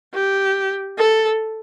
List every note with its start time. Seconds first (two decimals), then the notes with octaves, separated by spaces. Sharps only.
0.14 G4
0.98 A4